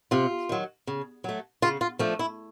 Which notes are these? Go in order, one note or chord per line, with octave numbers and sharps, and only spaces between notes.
C3 F4
D#3 F#3
C#3
F#3 A3
C#3 F4
F4
F3 A3 D4
E4